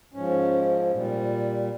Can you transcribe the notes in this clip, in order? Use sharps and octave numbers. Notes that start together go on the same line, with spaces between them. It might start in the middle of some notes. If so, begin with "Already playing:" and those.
G#2 F3 C#4
A#2 G3